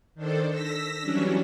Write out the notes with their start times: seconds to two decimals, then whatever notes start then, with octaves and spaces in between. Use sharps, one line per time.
0.15 D#3 D4 A4 C5
0.49 E6 A#6 B6
1.00 E3 F#3 G3 C#4 D4